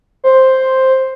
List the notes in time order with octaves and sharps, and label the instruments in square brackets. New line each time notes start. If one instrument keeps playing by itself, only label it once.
[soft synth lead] C5